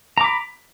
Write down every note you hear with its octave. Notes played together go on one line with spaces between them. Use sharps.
A#5 B5 D6